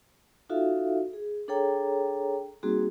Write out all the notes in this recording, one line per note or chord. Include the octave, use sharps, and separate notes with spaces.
D#4 F4 F#4 A4 E5 F5
G#4
D4 G#4 A4 C#5 G5 A#5
G3 A#3 C4 D#4 F#4 G#4